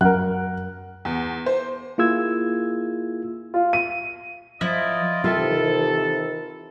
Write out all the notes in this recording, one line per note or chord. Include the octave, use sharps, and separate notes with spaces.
F#2 A#4 F#5 F#6
E2
C5
A#3 E4 F4 G#4 E6 G#6
F4
D#7
F3 E4 F4 D5 D#5
C3 D#3 E3 F4 A4 E5 G5